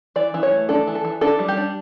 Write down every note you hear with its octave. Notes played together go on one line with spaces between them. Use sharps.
E3 D5
E3
C#5
A3
D4 A4
E3
A4
E3
D4 A4
G3
G4
D4